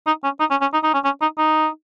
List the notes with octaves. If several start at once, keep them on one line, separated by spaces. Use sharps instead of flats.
D#4
C#4
D#4
C#4
C#4
D#4
D#4
C#4
C#4
D#4
D#4